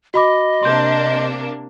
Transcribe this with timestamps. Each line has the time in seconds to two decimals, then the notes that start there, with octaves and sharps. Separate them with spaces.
0.14 F#4 D#5 B5 D6
0.63 C3 A#3 D4 C6 G6